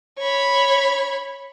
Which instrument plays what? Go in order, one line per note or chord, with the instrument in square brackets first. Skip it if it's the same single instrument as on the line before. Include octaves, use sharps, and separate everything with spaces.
[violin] C#5 B5